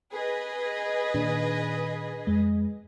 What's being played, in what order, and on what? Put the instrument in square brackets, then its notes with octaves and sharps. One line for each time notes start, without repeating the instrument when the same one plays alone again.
[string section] G#4 B4 D#5
[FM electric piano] A#2 D#3 D4
F2 G#3